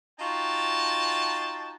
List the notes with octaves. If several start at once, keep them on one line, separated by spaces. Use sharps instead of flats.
D#4 F4 F#4 G5 A5